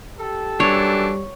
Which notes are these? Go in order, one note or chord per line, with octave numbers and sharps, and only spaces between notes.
G4 A4
F#2 E3 G3 D4 C#5